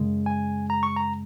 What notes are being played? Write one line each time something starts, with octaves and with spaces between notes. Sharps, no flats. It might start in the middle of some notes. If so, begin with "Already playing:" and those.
Already playing: F#2 C#3 G#3
G#5
A#5
C#6
A#5